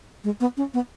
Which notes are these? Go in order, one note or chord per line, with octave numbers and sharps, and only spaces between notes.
G#3
B3
C#4
B3